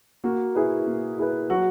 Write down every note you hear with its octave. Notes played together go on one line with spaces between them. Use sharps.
A#3 F#4
E4 G#4 B4
A#3
E4 G#4 B4
F#3 F#4